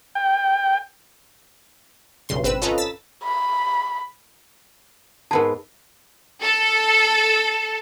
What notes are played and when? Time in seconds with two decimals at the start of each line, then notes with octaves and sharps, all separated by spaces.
0.15 G5
2.29 B1 G2 C#3 C6
2.44 G#1 C4 B4 E6
2.62 C#4 F4 A4 B4 D#5 A#5
2.78 E6 A6 B6
3.24 B5
5.31 G#2 B3 G#4 A#4 A5
6.42 A4